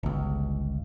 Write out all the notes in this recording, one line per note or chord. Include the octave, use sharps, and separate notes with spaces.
G1 C#2